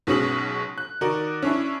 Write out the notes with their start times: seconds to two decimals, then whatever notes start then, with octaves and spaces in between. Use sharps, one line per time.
0.07 B1 B2 G#3 C#4 D#6 F#7
0.78 F#6
1.01 D#3 D#4 F#4 A#4 D5
1.42 C#4 D4 E4